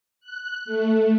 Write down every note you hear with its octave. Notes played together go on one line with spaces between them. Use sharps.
F#6
A3